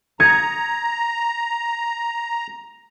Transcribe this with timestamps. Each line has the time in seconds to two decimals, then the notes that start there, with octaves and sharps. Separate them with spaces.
0.20 A#5 D#6 G#6 C#7